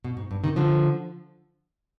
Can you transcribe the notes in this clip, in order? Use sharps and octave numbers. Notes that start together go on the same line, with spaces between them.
B2
G#2
G2
C3 D#3
D3 F3